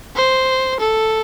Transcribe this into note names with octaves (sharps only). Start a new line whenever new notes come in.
C5
A4